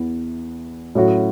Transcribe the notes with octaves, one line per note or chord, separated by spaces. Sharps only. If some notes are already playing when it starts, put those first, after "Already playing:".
Already playing: E2 E3 B3
A2 F#3 C#4 F#4